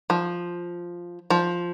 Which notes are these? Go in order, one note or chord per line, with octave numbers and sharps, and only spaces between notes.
F3
F3